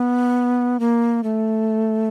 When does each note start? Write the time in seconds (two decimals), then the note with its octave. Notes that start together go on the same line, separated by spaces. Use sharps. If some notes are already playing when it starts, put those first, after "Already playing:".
Already playing: B3
0.80 A#3
1.24 A3